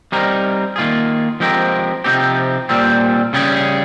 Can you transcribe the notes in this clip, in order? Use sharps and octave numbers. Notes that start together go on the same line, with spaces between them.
G3 C4 D#4 A#4
D#3 A#3 F4 G#4
F3 G#3 C4 G4 A#4
C3 F3 C4 D#4 G4
A#2 G3 C4
C#3 G3 C#4 G#4